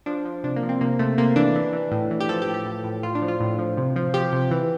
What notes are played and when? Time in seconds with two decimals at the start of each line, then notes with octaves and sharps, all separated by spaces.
0.06 F3 D4
0.25 F3
0.44 C3 D4
0.56 A#3
0.63 F3
0.69 C4
0.81 C3 A#3
0.99 C3 A3
1.18 C3 A#3
1.36 E3 D4
1.55 E3
1.73 E3
1.91 A2
2.11 E3
2.20 G4
2.29 F3 A4
2.42 G4
2.47 A2
2.54 G4
2.66 A2
2.84 A2
3.03 A2 F4
3.15 D4
3.22 F3
3.28 F4
3.40 A2
3.59 F3
3.77 C3
3.96 F3
4.14 F3 G4
4.32 C3
4.51 E3